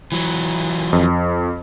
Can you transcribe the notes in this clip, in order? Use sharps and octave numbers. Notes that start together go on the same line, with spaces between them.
E3 F#3
F2